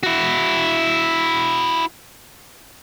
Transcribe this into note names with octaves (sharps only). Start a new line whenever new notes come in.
E4 F#4